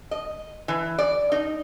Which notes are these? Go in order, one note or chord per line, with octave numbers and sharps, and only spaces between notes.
D#5
E3
D5
D#4